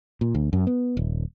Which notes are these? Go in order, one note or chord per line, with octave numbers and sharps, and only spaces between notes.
A#2
D2
F#2
B3
D#1